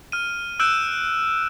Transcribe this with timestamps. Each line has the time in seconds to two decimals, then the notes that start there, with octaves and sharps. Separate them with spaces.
0.12 F6 D#7
0.60 E6 F#6 G6 D7 E7